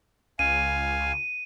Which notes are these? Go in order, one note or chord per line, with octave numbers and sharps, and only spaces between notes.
C#2 F5 G#5 D#7